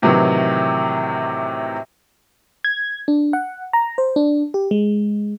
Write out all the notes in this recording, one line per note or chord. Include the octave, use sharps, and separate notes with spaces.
A2 C3 D#3 E3 F#3
G#6
D4
F#5
A#5
C5
D4
G4
G#3